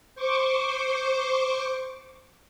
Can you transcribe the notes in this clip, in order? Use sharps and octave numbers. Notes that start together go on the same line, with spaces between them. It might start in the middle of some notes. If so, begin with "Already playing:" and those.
C5 C#6 D6